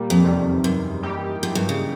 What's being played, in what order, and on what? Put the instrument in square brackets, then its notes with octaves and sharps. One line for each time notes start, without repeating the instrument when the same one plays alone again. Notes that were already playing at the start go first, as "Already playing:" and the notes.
Already playing: [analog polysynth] A#2 G3 A#3
[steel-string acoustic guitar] F2
[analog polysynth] E2 C3 D#3 G3
[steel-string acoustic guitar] F#2
[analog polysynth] E3 G3 A#3 D#4 G4
[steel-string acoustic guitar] F#2
G2
C#3